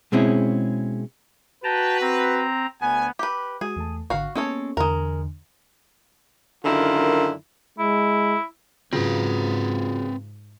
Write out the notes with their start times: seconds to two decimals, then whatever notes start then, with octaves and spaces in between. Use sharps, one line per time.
0.12 B2 G#3 C4 C#4 E4 G#4
1.64 F#4 B4 G5 A5 A#5
2.01 C4 A#5
2.81 D2 B3 G#5
3.19 G4 B4
3.61 G#3 F#4 G#4
3.76 E2 A3 A5
4.10 G#1 D3 F#4 F5
4.35 G#3 A#3 B3 C#4 A4 C#5
4.77 E2 D3 G#3 A#4
6.64 F#2 D3 D#3 E4 F4 A#4
7.79 G#3 E4
8.93 G#2 C#3 F#3 C4 F4 B4